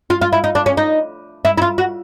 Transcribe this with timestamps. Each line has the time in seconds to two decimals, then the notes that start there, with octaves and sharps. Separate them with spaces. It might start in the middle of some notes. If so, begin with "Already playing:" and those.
0.10 F4
0.21 F4
0.33 E4
0.44 D#4
0.55 D4
0.66 C#4
0.77 D#4
1.45 E4
1.58 E4
1.62 F4
1.78 F#4